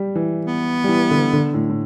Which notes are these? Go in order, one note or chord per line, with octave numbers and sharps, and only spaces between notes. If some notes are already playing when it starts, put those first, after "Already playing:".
Already playing: G3
E3
B3
G3
E3
D3
D3
A2
A2